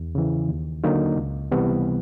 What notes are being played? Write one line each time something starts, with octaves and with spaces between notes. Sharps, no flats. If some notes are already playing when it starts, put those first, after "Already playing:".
Already playing: E2
C#3 E3
D#2
D3 F#3 A#3 D#4
C#2
C3 E3 G3 B3